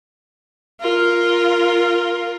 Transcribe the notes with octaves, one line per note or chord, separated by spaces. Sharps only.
F4 A#4